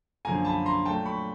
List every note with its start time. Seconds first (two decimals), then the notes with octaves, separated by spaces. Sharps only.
0.25 F#2 D3 F3 A#3 G#5 A#5
0.45 A5 B5
0.66 A#5 C6
0.85 A#2 F#3 A3 G5 A5
1.06 B5 C#6